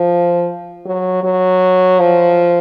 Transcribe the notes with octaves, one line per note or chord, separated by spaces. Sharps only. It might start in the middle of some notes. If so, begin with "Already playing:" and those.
Already playing: F3
F#3
F#3
F3